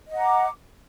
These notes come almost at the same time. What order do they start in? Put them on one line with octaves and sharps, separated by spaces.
D#5 F#5 A#5 D6